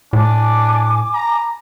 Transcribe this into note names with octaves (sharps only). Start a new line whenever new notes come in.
A2 D4 G#5 D6
A#5